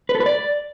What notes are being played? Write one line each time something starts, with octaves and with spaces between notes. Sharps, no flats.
B4
A4
B4
D5